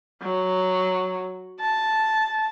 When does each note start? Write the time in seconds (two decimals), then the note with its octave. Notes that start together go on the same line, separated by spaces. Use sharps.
0.23 F#3
1.61 A5